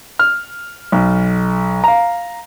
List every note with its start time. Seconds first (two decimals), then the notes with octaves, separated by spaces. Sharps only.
0.19 F6
0.92 B1
1.84 F5 A#5